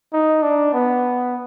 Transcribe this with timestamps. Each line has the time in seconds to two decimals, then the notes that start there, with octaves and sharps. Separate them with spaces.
0.13 D#4
0.43 D4
0.74 B3